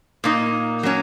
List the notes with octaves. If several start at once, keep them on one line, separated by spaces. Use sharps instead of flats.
A#2 A#3 D#4
F#3 A#3 C#4